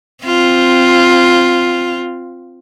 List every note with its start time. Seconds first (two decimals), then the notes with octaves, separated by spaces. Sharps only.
0.25 C4 F4